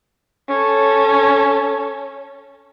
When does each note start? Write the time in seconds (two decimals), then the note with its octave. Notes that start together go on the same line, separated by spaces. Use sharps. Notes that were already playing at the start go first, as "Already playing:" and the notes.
0.48 C#4 A4